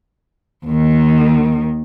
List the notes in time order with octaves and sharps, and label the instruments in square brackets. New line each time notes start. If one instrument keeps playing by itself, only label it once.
[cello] D#2 D#3